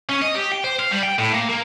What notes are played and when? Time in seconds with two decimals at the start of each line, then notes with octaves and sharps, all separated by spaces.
0.09 C#4
0.22 D#5
0.35 G4
0.52 G5
0.64 C5
0.79 F5
0.91 G3
1.03 G5
1.19 A2
1.33 A#3
1.49 A#3